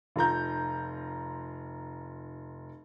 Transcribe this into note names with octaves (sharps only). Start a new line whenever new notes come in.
F1 F4 A#5 G6